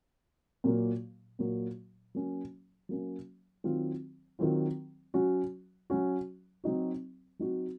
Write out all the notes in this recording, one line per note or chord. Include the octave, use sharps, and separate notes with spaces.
A#2 F#3 A#3
A#2 F#3 A#3
F#3 A#3 C#4
F#3 A#3 C#4
D#3 F#3 C4 F4
D#3 F#3 C4 F4
F#3 C#4 F#4
F#3 C#4 F#4
F#3 C4 D#4 F#4
F#3 C4 D#4 F#4